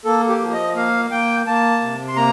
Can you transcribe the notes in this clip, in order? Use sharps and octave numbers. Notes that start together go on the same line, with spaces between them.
A#3 A4
G4
F3
D#5
A#3 F5
A#3 G5
A#3 A5
C3
C6
A#3 A#5